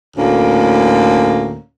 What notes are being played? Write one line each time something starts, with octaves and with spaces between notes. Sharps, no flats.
D2 A2 A#3 C#4